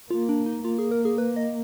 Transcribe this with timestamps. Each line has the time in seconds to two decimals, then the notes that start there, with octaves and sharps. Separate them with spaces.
0.11 A#3 F4
0.29 D4
0.46 D#4
0.65 A#3 F4
0.79 G#4
0.91 A#4
1.05 G#4
1.18 B4
1.36 D#5